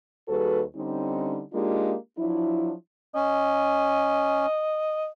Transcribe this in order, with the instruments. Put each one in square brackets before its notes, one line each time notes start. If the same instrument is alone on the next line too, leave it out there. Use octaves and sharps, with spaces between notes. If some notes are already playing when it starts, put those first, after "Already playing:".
[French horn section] D#2 G3 F#4 G#4 A4 B4
D3 G3 C4 C#4 D#4
G#3 A#3 D4 D#4 F4 G4
F3 F#3 D4 E4
[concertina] C#4 [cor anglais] D#5